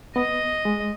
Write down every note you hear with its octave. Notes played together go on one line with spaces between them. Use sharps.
B3 D#5
G#3